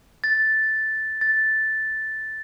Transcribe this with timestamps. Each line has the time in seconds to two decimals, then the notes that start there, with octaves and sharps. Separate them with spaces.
0.24 A6
1.21 A6